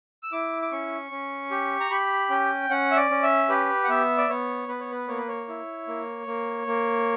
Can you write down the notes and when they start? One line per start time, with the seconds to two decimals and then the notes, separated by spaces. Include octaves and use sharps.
0.23 E6
0.32 E4 D6
0.62 D6
0.72 C#4 C#6
1.11 C#4
1.51 G4
1.80 A#5
1.90 G4 B5
2.30 C#4 G5
2.70 C#4 F#5
2.91 E5
2.97 D5
3.10 C#4
3.23 E5
3.49 G4 B4
3.84 F#5
3.89 B3 E5
4.18 D5
4.29 B3 C#5
4.68 B3 B4
4.80 C#5
4.92 B4
5.08 A#3 C#5
5.18 B4
5.28 C#5
5.48 E4
5.88 A#3
6.27 A#3
6.67 A#3